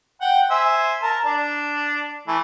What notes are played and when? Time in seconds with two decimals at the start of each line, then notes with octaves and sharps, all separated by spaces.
0.21 F#5 G5
0.50 C5 E5 G#5
1.02 A#4 A5
1.26 D4 D5
2.28 E3 A3